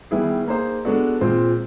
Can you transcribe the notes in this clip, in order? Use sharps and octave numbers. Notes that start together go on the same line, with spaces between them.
D#3 G3 B3 E4 G#4
A#3 D#4 G#4 C5
G#3 B3 D4 F#4 A4
A#2 F3 G#3 C4